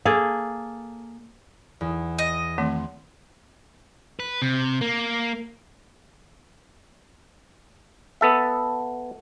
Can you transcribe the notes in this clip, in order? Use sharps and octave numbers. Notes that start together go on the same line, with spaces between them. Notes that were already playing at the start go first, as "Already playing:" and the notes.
A#3 G#4 A4
E2
D#5
D#3 A3 C4 C6
B4
C3
A#3
B3 A4 E5